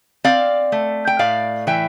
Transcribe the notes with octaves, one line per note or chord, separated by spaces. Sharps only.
C4 D5 F5
A3
G5
A2 D5 F5
E3 E5 G5